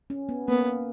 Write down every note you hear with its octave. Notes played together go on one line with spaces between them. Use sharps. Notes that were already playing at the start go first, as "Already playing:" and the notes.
C#4
B3
A#3 B3